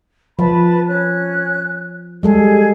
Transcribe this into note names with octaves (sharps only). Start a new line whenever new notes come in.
F3 B4 A5 B5
C#4 F#6
G3 G#3 G#4 A4